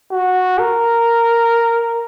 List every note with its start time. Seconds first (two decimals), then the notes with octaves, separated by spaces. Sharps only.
0.11 F#4
0.59 A#4